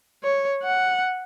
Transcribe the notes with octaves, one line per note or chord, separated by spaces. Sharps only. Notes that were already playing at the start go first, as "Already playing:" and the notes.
C#5
F#5